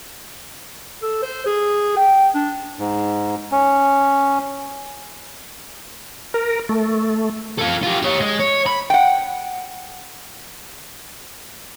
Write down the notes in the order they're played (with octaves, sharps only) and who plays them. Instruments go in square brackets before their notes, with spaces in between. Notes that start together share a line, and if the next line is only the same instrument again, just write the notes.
[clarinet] A4
C5
G#4
G5
D4
[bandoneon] G#2
C#4
[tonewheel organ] A#4
A3
[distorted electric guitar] F4 A4
F4 G4
G4 C#5
G#3
C#5
B5
[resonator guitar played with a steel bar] F#5 G5